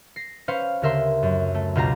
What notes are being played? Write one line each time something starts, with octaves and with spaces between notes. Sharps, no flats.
A#6 C7
C#4 B4 C5 F5 C#7
D2 C#3 G4 A#4 E5 C6
F#2
A3
C#2 B2 F4 G4 F5 A#5